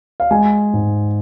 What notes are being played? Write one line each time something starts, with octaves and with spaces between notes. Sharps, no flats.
F5
G#3 G#5
G#2